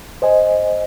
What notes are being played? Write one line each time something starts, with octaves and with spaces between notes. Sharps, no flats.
C5 D#5 G#5